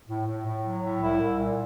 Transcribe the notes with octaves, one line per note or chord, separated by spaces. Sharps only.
A2
A2
A2
F#3
A2
C2 E4
C2
A#2